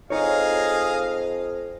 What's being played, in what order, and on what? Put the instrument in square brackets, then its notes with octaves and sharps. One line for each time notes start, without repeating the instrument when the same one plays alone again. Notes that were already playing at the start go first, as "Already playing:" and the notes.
[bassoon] F2 [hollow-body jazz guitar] D#4 C#5 [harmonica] G#4 D#5 F5